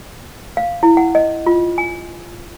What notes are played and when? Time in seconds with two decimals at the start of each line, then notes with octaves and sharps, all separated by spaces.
0.57 F5
0.83 E4
0.97 F#5
1.15 D#5
1.47 F4
1.78 G#5